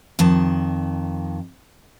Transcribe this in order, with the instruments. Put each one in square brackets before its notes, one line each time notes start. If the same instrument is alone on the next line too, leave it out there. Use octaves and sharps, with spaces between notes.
[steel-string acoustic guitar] F2 D#3 A5